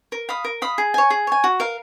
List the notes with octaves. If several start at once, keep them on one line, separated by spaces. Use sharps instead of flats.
A#4
F5 B5 D#6
A#4
F5 B5 D#6
G#4
C#5 G#5
G#4
C#5 G#5
F#4
A#4 F5